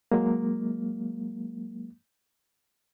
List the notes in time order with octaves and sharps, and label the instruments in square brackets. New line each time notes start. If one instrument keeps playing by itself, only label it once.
[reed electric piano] F#3 G#3 A#3